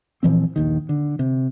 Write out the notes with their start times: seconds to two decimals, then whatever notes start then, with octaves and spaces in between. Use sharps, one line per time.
0.23 A#2 E3 F3 C4
0.56 A#1 D#2 D#3
0.89 D3
1.19 C3